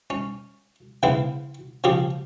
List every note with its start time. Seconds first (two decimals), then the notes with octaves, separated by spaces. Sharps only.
0.10 C#4
1.03 C#3 E3 B3 C4 E4
1.84 C#3 F3 G4 G#4